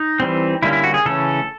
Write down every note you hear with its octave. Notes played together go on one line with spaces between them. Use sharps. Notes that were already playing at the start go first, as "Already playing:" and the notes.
Already playing: D#4
E3 G3 C4
D3 G3 A#3 C#4 E4
E4
F#4
G#4
C#3 E3 A3 C#4 A4